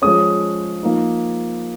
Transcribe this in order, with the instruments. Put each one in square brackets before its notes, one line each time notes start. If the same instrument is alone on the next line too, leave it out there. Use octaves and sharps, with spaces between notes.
[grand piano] F3 G#3 C#4 D#6
F3 A#3 D#4